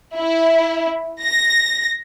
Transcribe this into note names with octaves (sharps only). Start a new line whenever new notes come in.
E4
A#6